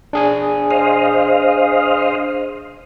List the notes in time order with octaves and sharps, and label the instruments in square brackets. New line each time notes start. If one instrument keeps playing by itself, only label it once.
[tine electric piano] D4 G#4 G#5
[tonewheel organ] C5 D#5 F5